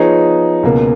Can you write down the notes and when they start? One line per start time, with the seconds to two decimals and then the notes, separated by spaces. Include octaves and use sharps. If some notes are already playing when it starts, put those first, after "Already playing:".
Already playing: F3 B3 D#4 G#4 C#5
0.63 C#2 B2 A#3